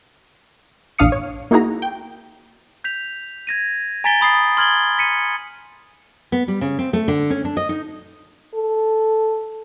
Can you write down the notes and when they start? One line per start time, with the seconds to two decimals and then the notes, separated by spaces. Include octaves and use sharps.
0.99 A#1 E2 D4 F5 D#6 C#7
1.12 C#5
1.51 A#3 D#4 E4 F#4 G#4 A#5
1.82 G5
2.84 G6 B6 F7
3.47 G#6 A#6 D#7
4.04 G#5 A#5 A6 B6 D7 G7
4.21 B5 D#6 A6 C7
4.57 C6 F6 G#6 F#7 G7
4.99 B6 C#7 D#7
6.32 B3
6.48 G3
6.61 C#3
6.79 C4
6.93 A3
7.08 D3
7.30 C#4
7.45 D4
7.57 D#5
7.69 D#4
8.55 A4